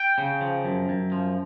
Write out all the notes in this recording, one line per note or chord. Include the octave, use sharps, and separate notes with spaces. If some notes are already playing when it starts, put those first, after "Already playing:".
Already playing: G5
C#3
F3
F#2
F#2
F3